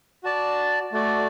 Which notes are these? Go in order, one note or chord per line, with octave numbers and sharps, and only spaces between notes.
F#4 D5 A5
A3 F#4 D5